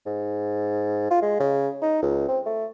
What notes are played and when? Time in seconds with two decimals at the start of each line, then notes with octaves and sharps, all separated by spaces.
0.06 G#2
1.10 F4
1.22 G#3
1.40 C#3
1.82 D#4
2.02 C#2
2.28 C4
2.46 A3